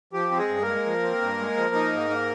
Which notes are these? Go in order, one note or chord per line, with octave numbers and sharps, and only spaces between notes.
F3 G4
C4
G#3 G#4
G2
A#3 A#4
G#3
F3
C4
G2
G#3
F3
D#4
G#2
A#3